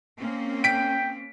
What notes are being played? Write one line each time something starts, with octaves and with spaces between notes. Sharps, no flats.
A#3 C4 C#4
G5 B6 D7